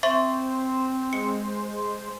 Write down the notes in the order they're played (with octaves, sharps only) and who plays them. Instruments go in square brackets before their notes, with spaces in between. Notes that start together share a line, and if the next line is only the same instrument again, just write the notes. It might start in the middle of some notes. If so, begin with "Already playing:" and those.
[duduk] C4 [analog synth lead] C5 [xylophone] E5 C6 C#6
[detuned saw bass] G#3 [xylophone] C#7